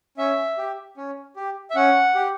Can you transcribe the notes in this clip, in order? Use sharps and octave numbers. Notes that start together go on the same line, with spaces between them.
C#4 E5
G4
C#4
G4
E5
C#4 F#5
G4